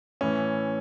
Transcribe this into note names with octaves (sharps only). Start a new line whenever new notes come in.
A2 E3 C#4